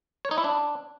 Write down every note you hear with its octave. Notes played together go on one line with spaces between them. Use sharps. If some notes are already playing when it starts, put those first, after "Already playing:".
C#5
D#4
E4
D4